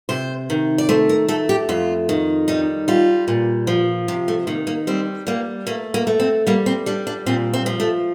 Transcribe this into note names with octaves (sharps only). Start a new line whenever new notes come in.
C3 C5
D#3
D5
A3 C5
A#4
A3 A4
G4
F2 F4
D#3
G3 D#4
G3 F4
A#2
F3
C3 G4
A3
D#3 A#3
A#3
G3 C4
G3 A#3
A3 A#3
A#3
A3
C4
G3 A#3
C4
G3 D4
D4
A#2 C4
C4
F3
A3